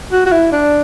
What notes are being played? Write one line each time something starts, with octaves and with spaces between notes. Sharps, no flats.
F#4
F#4
E4
D4